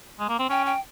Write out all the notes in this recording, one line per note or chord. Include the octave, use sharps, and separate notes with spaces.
G#3
A#3
C4
C#4 G5
G5